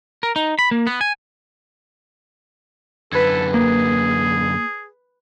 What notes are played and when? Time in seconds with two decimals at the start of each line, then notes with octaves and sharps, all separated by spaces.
0.23 A#4
0.36 D#4
0.59 B5
0.71 A#3
0.87 B3
1.01 G#5
3.13 F#2 D3 A4 B4 G#6
3.54 A#3 G#4